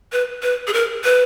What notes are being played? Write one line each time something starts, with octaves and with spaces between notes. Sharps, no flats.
B4
B4
G#4
A#4
B4